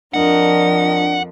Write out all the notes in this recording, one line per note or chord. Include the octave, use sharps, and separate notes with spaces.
F2 F3 D4 A#4 D#5 F#5